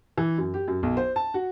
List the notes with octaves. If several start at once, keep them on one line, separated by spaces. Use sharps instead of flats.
E3
F#2
G4
F#2
B1
C5
A5
F#4